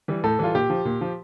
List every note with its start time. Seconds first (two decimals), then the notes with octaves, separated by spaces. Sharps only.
0.08 E3 G3
0.24 A2 A4
0.39 E3 G3 F4
0.54 A#2 G4
0.70 F3
0.85 A#2
1.01 F3